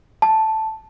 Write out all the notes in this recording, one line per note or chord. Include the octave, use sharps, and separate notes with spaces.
A5